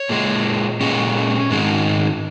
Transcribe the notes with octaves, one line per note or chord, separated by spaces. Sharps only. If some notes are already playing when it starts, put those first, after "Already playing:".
Already playing: C#5
A#2 G#3
A#2 G#3 C#4
G#2 D#3 G#3